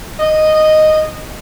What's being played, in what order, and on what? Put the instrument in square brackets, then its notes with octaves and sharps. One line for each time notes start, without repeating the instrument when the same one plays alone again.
[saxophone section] D#5